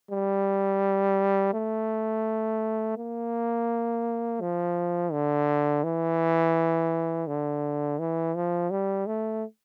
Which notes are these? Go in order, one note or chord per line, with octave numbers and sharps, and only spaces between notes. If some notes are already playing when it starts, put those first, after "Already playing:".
G3
A3
A#3
F3
D3
E3
D3
E3
F3
G3
A3